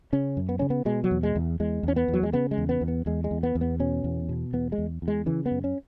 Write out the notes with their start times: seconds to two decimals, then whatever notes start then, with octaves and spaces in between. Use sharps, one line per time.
0.13 C#3 C#4
0.37 F#2
0.49 B3
0.59 C#3 C#4
0.70 B3
0.85 B2 G#3
1.04 F#3
1.11 E2
1.23 G#3
1.36 E2
1.60 E2 G#3
1.83 E2 C#4
1.96 B3
2.08 E2
2.13 F#3
2.23 G#3
2.33 C#3 B3
2.51 G#3
2.58 E2
2.69 B3
2.81 E2
2.88 B3
3.06 E2 G#3
3.24 G#3
3.31 E2
3.43 B3
3.55 E2
3.61 B3
3.80 B2 C#4
4.04 E2
4.29 B2
4.53 E2 B3
4.72 G#3
4.78 E2
5.02 E2
5.08 G#3
5.26 C#3 E3
5.46 B3
5.51 F#2
5.64 C#4